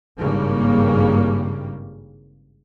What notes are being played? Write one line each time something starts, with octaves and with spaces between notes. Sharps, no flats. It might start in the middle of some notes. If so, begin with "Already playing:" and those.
G#1 G2 C#3 G3 A#3